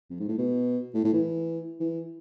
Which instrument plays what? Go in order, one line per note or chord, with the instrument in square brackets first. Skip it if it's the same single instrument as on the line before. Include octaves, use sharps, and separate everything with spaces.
[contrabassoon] F2
G#2
A2
B2
A2
A2
E3
E3